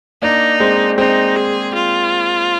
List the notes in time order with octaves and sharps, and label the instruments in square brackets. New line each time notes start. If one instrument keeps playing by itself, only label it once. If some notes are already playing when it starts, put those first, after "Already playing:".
[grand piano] A#3 D4 [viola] D#4
[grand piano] G#3 C4
[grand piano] G#3 C4 [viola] D#4
[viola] G#4
F4